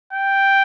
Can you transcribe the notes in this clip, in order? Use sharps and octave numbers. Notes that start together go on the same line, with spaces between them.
G5